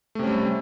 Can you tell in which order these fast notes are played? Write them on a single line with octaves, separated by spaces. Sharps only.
A3 C3 C#4 G3